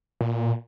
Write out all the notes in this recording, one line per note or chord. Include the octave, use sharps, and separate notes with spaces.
A#2